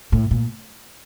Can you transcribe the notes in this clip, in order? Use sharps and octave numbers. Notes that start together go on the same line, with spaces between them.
A2
A#2